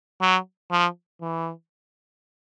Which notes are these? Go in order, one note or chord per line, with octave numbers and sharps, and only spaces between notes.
F#3
F3
E3